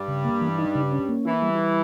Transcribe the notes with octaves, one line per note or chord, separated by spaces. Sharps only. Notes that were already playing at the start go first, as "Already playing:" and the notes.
Already playing: G2 G3
C#3
A#3
E3
D#4
C#3
C#4
A#3
E3 E4
G3
E4